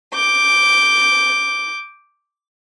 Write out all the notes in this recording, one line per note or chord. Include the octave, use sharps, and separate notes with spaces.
D6 G6